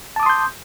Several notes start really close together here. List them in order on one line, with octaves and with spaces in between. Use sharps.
A5 D6 D#6 C6 G6